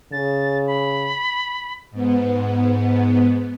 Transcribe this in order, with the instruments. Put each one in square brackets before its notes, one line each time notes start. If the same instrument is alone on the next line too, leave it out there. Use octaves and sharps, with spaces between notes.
[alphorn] C#3 [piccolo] A6
[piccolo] B5
[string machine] G#2 B3